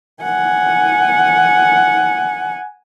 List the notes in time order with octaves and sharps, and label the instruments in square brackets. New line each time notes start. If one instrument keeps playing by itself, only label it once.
[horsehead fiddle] F#5 G#5